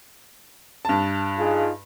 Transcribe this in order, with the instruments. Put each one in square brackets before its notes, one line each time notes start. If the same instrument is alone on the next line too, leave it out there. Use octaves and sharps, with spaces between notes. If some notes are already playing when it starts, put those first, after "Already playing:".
[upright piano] G2 A5
[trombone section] D#4 F4 G#4